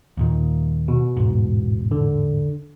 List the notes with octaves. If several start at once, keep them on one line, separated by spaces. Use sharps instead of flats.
D#2 A#2 D#3
B2
E1 A1 G#2
D3